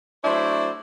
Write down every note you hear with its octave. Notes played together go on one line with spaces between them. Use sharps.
F#3 A3 D4 E4 C5